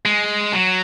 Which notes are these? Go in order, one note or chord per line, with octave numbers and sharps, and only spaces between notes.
G#3
F#3